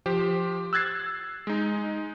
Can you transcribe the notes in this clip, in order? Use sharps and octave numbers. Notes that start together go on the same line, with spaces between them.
F3 G4 C5
E6 F#6 G#6 A6 C7
G#3 D#4